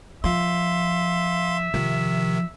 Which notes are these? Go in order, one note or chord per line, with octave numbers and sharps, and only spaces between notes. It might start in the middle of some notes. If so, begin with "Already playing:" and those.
F3 E5 F5 C6
C3 D#3 F3